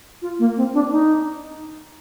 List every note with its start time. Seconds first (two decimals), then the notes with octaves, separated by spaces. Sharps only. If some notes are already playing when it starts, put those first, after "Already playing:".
0.22 F4
0.39 A#3
0.57 C4
0.74 D4
0.91 D#4